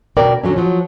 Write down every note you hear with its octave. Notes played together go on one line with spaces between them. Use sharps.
D2 B2 A#4 D5 G5
D3 F#3 G#3 C#4
F3 F#3